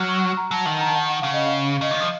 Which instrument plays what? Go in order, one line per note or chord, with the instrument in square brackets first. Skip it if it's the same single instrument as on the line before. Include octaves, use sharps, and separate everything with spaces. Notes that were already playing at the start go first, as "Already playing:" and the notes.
Already playing: [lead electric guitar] F#3 [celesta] F6 F#6
[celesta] C#6
A#5
[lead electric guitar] F#3 [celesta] A5
[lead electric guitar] D#3 [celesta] F#5
[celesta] A#5
A5
F#5
F#5
[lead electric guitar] C#3 [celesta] F5
[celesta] D#5
F5
[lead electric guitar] C#3 [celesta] D#5
[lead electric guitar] D#3
F3